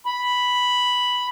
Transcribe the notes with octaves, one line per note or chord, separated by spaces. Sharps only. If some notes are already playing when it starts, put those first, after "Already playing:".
B5